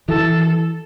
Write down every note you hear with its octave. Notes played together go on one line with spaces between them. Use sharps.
E3 A4